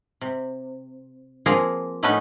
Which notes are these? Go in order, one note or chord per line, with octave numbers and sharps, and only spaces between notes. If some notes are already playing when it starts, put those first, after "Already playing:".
C3
F3 A#3 C4 F4 G#4 A#4
A2 A3 B3 C#4 D#4 B4